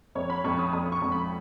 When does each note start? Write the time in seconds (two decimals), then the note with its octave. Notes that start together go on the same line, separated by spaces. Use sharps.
0.15 F2 C#5
0.30 B5
0.44 F2 C#6
0.59 D#6
0.73 F2 D#6
0.92 C#6
1.02 F2
1.12 B5